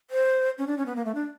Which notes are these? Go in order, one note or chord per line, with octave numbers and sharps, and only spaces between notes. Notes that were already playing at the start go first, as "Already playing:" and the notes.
C5
C#4
D4
C#4
B3
A#3
A3
D4